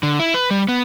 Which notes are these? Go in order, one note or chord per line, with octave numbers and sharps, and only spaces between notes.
D3
E4
B4
G3
B3